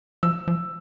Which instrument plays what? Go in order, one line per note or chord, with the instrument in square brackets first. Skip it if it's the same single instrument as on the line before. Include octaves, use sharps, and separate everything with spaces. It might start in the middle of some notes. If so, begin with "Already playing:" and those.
[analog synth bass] F3 [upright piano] E6
[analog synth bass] F3